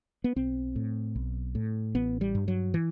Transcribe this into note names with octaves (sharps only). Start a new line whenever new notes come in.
B3
B1 C4
A2
B1
A2
A1 B3
G3
G2
F#3
E3